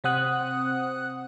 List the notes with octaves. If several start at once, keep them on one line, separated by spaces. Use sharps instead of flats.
C3 C4 C5 F#5 D#6 F#6